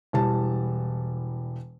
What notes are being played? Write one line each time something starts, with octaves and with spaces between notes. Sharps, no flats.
E1 E3 G3 A5